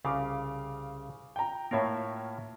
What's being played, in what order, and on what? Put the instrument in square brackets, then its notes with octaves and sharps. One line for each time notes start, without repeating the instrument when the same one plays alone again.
[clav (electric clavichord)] C2 C#3 [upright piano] F5 D6
[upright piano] G5 A#5
[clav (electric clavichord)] A2 F4 A#4 [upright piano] A#3 C#5 E5